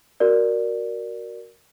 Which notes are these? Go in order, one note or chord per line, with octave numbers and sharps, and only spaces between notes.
F#4 A#4 D5